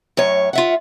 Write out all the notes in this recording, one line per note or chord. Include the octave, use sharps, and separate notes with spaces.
F#2 A2 C#5
F4 E5 F#5